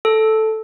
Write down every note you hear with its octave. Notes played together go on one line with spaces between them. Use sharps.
A4